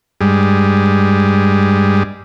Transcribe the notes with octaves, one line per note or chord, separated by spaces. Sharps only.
G2 G3 G#3